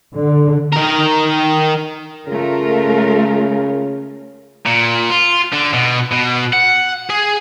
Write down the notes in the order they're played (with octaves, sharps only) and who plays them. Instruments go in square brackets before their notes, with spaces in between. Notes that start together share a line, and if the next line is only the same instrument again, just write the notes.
[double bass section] D3
[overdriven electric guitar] D#3 A#4
[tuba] C#3 [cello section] A3 F4 A#4
[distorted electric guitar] A#2
F4
D3
B2
B2
F#5
G#4